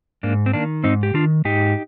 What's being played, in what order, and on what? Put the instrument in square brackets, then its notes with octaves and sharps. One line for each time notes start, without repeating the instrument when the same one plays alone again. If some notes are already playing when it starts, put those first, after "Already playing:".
[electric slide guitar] G#2 A#3 D4
C4
D#3 A#3 D4
G#2 C4 D#4
G4
D#3 D4 F4
G#2 D#4 G4